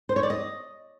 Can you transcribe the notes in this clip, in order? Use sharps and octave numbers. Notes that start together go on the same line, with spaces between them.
C5
C#5
D5
D#5